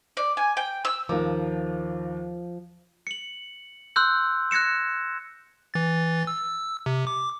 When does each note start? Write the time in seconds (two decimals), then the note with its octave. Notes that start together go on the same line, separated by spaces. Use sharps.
0.17 D5
0.37 G#5
0.57 G5
0.85 E6
1.09 D#2 F3 A#4 D6
3.07 C#7 F#7
3.96 C6 E6 F#6 G6
4.51 F#6 G#6 A#6 C#7 E7
5.74 E3 A6
6.27 E6
6.86 C3
7.07 D6